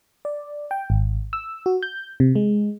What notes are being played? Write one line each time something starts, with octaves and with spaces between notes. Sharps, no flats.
D5
G5
G#1
E6
F#4
G6
C3
G#3